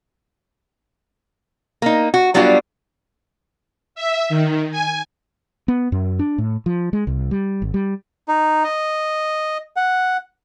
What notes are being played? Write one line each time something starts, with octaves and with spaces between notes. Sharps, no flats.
A#3 D#4
F#4
F#3 G3 B3 D4 F4 F#4
E5
D#3
G#5
B3
F#2
D4
A2
F3
G#3
C2
G3
G#1
G3
D#4
D#5
F#5